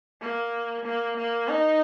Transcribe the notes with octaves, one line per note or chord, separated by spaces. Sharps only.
A#3
A#3
A#3
D#4